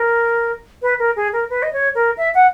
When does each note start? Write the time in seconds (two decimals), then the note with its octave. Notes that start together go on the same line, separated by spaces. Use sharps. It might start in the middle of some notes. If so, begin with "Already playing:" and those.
Already playing: A#4
0.82 B4
0.99 A#4
1.16 G#4
1.33 A#4
1.50 B4
1.63 D#5
1.73 C#5
1.95 A#4
2.17 E5
2.34 F#5